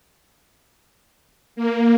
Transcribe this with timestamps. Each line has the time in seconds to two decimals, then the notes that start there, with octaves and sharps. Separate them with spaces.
1.56 A#3